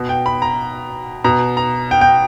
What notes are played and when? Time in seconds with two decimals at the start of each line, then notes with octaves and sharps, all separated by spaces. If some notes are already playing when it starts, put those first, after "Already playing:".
Already playing: B2
0.09 G5
0.26 B5
0.42 A#5
1.24 B2 A#5
1.57 A#5
1.91 G5
2.01 G5